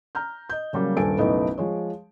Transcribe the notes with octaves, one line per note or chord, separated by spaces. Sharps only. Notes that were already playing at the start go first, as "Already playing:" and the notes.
A#5 F6 G6
D#5 G6
C#3 F#3 G3 A#3
D#1 G2 A4 G#5 D7
F#1 B1 A3 B3 D#4 E4
F3 G#3 C#5